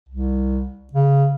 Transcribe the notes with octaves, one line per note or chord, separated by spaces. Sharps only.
C2
C#3